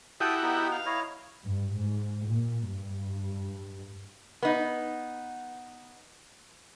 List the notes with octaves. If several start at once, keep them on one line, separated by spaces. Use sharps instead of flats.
E4 F#4 G4 A4 G5 D#6
B3 D#4
F5
E4 C#5 D#5
G2
G#2
A#2
G2
B3 D#4